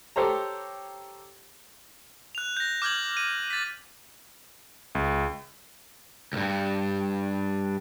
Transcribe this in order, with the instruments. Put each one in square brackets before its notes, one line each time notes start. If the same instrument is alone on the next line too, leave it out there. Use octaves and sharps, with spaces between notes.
[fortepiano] G4 A4 C5 C#5 A#5
[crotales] F#6 F7
G6 A#6
D6 F6 G6 G#6 F#7
D#7
A6 B6
[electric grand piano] C#2
[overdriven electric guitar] C#2 G2